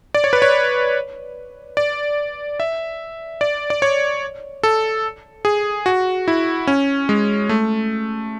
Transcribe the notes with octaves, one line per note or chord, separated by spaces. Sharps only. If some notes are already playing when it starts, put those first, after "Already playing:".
D5
C#5
B4
C#5
D5
E5
D5
D5
C#5
A4
G#4
F#4
E4
C#4
G#3
A3